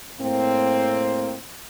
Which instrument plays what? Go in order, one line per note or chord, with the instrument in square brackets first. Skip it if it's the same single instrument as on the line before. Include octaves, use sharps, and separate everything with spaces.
[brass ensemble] A2 A#3 C4